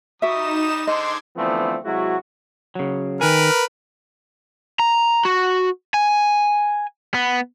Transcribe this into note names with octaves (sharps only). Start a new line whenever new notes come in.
G3 D#4 F#4 E5 D#6 E7
D3 G#3 C5 D#5 C6 D6 G#6
D3 E3 F3 A3 B3 C4
C3 F#3 G#3 E4 F#4
C#3 F#3
D#3 A#4 B4 G#5
A#5
F#4
G#5
B3